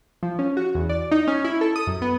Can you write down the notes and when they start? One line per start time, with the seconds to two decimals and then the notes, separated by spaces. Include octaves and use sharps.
0.23 F3
0.39 C#4
0.57 F#4
0.75 E2
0.89 D5
1.11 D#4
1.27 C#4
1.44 E4
1.61 A4
1.76 D#6
1.87 F#2
2.02 B3